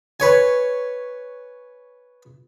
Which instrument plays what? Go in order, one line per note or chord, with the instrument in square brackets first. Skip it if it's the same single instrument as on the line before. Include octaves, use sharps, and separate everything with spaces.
[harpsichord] B4 C#5 G#5